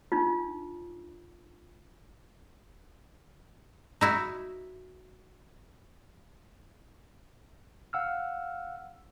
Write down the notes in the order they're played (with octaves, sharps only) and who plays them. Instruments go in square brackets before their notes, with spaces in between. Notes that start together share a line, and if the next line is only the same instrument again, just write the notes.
[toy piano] D4 D#4 F4
[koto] D#4 E4 F#4
[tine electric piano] F5 F#5 E6 F6